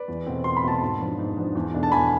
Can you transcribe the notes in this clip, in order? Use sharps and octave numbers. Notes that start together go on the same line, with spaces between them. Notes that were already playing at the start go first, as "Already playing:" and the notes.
Already playing: B4 D5
E2
B2 A3 C4
E2 C6
B5
B2 A3 C4 A5 C6
G#2
F3 B3 D4
G#2
F3 B3 D4
E2
B2 A3 D4
A5
E2 G#5 B5